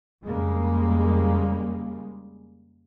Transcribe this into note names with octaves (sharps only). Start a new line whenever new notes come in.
F2 C#3 G3 G#3 A#3